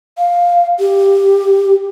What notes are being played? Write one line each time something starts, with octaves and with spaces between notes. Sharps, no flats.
F5
G4